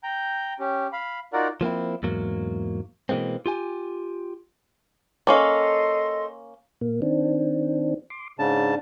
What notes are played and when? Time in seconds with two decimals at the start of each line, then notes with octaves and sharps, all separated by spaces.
0.03 G5 A#5 G6
0.59 C#4 G4
0.93 F5 B5
1.33 D#4 F4 F#4 A#4 D5 F#5
1.61 F3 A#3 C4 E4
2.03 E2 G#2 F#3 A#3
3.09 B2 E3 G#3 A#3 C4
3.46 F4 G4 G#5
5.27 A#3 C#4 A4 D#5 F5 C6
6.81 A#2 A#3
7.02 D#3 C4 D4
8.10 C6 D6
8.39 G#2 C#3 D4 A5